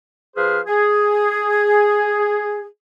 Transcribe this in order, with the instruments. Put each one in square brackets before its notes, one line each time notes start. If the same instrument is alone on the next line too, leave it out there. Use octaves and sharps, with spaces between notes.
[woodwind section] F3 G#4 B4 C5 C6 F6
G#4